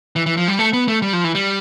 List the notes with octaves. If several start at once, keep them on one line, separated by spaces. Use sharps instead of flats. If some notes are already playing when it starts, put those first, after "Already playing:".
E3
E3
F3
G3
A3
B3
A3
G3
F3
E3
G3